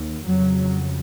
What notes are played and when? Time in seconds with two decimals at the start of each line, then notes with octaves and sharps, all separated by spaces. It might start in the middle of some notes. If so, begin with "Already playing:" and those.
Already playing: D#2
0.26 F2 C#3 F#3